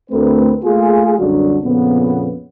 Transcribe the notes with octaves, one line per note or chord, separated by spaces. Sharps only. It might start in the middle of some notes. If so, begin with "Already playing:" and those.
D2 A3 C4 A#4 B4
A3 A#3 F4 G#4
C2 F#2 D3 F#3 D4 F#4
F2 A#2 C#3 B3